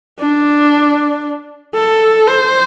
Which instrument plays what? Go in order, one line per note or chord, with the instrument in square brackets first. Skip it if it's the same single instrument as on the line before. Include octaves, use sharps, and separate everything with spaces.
[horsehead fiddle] D4
A4
C5